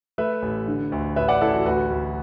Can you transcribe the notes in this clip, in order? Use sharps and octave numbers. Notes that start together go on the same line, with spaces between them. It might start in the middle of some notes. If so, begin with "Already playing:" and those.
A3 B4 E5
A1
D3
D2
A1 B4 E5
D5 F#5
A1 E4 A4
F#4
D2 F#4 B4
D2